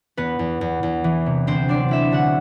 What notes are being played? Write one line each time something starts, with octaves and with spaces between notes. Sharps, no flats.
E2 B3 B4
E2
E2
E2
E3
C3
D2 C4 C5
F#3 D4 D5
D2 E4 E5
D3 F#4 F#5